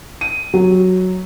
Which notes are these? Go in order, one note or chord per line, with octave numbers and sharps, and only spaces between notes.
D#7
F#3